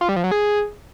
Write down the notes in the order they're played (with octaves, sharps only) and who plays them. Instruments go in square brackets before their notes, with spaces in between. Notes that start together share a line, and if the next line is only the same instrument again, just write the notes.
[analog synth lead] F4
G3
F3
F#3
G#4